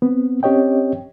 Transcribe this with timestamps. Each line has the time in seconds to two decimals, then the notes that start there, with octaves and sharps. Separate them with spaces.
0.02 B3 C4
0.43 C4 C#4 G4 C#5 D#5 G5